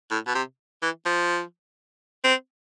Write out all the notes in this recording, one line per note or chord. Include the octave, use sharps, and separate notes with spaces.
A2
B2
C3
E3
F3
C4